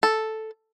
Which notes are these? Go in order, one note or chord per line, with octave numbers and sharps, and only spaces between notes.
A4